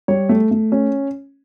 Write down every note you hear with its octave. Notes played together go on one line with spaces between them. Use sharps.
G3 C#5
A3
A3
C#4